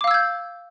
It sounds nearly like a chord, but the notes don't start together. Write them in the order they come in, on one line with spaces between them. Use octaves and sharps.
D6 F5 E6 G#6 G6